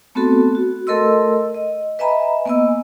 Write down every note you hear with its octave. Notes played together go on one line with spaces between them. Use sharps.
A3 B3 C4 F#4 A4
F#4
A3 A4 A#4 D#5 C6 E6
D#5
B4 D#5 E5 G#5 A#5 B5
A#3 B3 D#5 G#5 E6